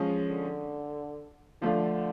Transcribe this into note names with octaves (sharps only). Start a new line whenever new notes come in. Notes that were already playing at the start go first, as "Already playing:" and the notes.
Already playing: F3 G#3 C#4 G#4
D3
D3 F3 A3 D4 F4